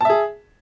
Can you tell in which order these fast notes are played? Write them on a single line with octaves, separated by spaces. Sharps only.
A5 E5 G#4